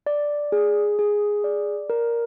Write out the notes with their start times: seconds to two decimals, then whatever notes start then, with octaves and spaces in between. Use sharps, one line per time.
0.06 D5
0.52 G#4
0.99 G#4
1.44 D5
1.90 A#4